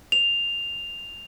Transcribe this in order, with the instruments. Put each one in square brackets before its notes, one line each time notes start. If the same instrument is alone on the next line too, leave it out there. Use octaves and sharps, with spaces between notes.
[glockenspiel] F7